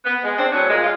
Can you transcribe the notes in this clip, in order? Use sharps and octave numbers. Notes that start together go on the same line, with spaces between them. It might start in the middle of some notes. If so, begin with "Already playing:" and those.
B3
G#3
C4 D4
A2 F#3 B3 G#4 C#5
A#2 G#3
G#3 F4